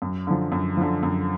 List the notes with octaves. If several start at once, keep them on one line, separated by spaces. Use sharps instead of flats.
F#2
D3 F3
F#2
D3 F3
F#2